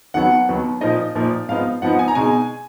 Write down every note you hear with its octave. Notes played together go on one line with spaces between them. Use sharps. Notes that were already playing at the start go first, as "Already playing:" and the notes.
D#2 D#3 F#3 B3 F#5
D#2 D#3 F#3 B3
A#2 F3 A#3 D#4 D#5
A#2 F3 A#3 D#4
G#2 F3 B3 D#4 F5
G#2 F3 B3 D#4 F#5
G#5
A#5
B2 G#3 D#4 G#5